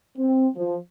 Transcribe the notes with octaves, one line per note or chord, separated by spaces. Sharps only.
C4
F3